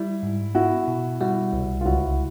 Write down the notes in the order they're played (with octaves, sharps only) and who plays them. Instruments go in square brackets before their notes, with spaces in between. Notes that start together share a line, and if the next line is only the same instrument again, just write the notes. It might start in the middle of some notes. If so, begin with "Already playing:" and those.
Already playing: [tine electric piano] G3 [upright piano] E4
[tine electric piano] G#2
[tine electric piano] B3 [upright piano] E4 F#4
[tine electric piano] B2
[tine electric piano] G3 [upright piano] E4 F#4
[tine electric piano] C2
[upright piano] F4
[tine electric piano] C#2 [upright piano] E4 F#4